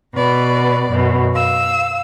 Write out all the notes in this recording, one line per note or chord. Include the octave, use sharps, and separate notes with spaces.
B2 B4 D5
F#2 B2
F5 E6